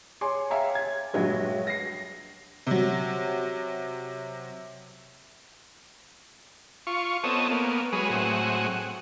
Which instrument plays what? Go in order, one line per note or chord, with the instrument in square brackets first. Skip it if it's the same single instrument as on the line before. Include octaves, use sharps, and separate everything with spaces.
[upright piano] G#4 C#5 G#5 C6 D6
C#5 E5 F5 G5 G#5 A#5
G#6
A#1 G2 F#3 G#3
A#6 C7
[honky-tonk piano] C3 F#3
[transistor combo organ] F4 C#6
B3 C4 A4 C#5 D#5
A#3 B3
F#3 G#3 G#4 B4 C#5
A2 F#3 C4 G#4 F#5